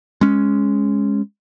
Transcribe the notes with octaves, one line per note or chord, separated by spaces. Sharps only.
G#3 C#4